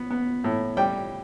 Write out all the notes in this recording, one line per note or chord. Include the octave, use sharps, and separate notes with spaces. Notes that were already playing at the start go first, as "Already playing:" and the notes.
Already playing: B3
B3
A2
G3 G5